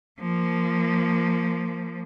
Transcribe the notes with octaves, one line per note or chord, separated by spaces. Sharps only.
F3 A#3